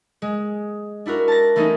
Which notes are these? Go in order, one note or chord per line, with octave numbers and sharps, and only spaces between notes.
G#3
D4 E4 F#4 A#4
A5 A6 A#6
E3 A3 A#3 C#4 D#4